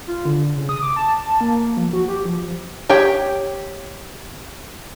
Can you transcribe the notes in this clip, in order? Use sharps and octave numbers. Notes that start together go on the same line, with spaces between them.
F4
D3
C#3
D#6
D6
A5
A5
A#3
F3
F#4
G4
F3
G4 C#5 G5